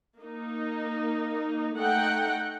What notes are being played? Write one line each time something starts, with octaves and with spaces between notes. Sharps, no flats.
A#3 D#4
A3 D#4 F#5 G5